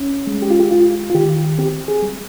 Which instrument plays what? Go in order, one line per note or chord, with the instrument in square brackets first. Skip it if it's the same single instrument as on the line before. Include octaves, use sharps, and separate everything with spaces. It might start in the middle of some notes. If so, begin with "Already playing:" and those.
Already playing: [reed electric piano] C#4
G#3
G4
F4
G4
F4
F4
D#3 G4
C4 G4
G#4
G3